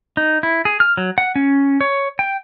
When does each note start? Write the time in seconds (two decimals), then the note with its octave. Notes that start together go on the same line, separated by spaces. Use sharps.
0.17 D#4
0.43 E4
0.65 G#4
0.80 F6
0.97 F#3
1.18 F#5
1.36 C#4
1.81 C#5
2.19 G5